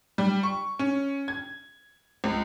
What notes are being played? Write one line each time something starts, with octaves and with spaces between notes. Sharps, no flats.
G3
C#6
C#4
G#6
C#2